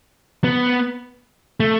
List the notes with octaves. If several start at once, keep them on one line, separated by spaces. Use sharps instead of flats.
B3
A3